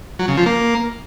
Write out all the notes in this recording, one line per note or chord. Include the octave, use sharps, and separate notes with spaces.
F#3
C#3
F3
A#3